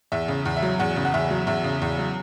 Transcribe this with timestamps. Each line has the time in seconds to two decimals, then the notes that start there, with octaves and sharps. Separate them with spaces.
0.12 E2 E5
0.28 C#3
0.46 E2
0.57 E5
0.62 F#3
0.79 E2 F#5
0.96 C#3
1.05 F#5
1.14 E2 E5
1.31 F#3
1.47 E2 E5
1.64 C#3
1.82 E2
1.99 F#3